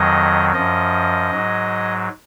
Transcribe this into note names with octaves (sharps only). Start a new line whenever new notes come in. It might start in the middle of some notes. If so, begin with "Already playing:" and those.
Already playing: F2 D#3 F#3 D#5
F#2 F3 D#5
G#2 F#3